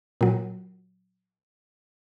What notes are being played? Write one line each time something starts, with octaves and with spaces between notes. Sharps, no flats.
A#2 F#3